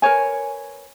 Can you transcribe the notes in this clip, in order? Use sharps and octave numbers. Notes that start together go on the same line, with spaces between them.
A#4 B4 C#5 G#5